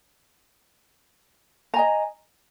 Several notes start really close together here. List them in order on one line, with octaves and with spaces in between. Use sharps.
A#5 G#5 D#5